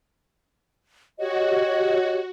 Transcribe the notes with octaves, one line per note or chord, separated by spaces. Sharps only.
F#4 G4 C#5 D#5